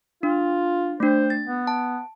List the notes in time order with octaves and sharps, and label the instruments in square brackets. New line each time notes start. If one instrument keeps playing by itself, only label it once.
[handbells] D4 [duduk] F4
[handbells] A3 D4 [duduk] C5
[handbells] A6
[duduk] B3
[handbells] A5